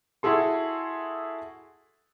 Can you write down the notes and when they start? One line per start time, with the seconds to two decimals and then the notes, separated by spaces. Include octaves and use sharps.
0.23 E4 F#4 G#4 A4 C6